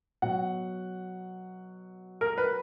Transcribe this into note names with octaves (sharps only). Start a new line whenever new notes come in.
B2 F#3 F#5
A#4
B4